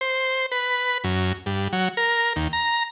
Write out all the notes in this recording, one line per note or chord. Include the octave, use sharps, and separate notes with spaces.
C5
B4
F#2
G2
F#3
A#4
D#2
A#5